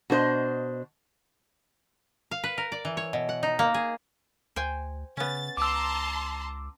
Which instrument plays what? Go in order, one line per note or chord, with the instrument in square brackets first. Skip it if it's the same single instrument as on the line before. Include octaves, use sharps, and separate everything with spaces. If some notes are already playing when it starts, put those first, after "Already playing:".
[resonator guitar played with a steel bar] B2 D4 C5 D#5
[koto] F5
B4
A#4
D5
E3
C#5
B2
F#5
D#4
A#3
G#4
[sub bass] D2 [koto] C5 G5 G#5
[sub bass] C#3 [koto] B3 C#4 [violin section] A6
[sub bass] C#2 [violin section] A5 A#5 C6 [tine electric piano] D6 E6